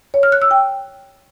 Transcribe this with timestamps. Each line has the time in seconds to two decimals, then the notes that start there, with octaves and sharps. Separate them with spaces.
0.14 C#5
0.23 F6
0.32 F#6
0.42 E6
0.51 G5